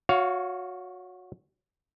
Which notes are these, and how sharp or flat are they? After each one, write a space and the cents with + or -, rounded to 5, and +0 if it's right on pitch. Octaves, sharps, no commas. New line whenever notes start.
F#4 -25 C#5 +15 F5 +0